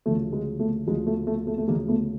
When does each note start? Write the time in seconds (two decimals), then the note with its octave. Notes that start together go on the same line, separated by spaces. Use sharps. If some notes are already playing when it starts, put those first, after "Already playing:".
0.06 D2 C#3 F3 A3
0.33 G#3
0.60 A3
0.87 D2 C#3 F3 G#3
1.07 A3
1.27 A3
1.47 A3
1.58 A3
1.68 D2 C#3 F3 G#3 A#3
1.88 A3 B3